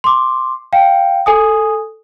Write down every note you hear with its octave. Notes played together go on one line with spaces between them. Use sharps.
C6 D6
F5 G5
A4 G#5 D#6